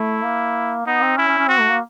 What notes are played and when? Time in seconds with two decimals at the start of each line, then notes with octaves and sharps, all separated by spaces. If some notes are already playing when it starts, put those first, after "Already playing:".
Already playing: A3 E4
0.24 A#3
0.86 B3 D#4
1.02 C4
1.17 C#4 E4
1.28 C#4
1.38 C#4
1.49 C4 F#4
1.60 A3
1.70 A#3